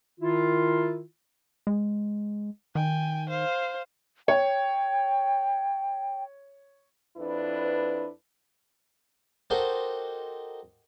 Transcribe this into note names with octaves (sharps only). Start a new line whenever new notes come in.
D#3 E4 F4
G#3
D#3 G5 G#5
C5 F5
C#5 G5
F2 D4 E4 B4
D#4 F#4 G4 A4 A#4 C5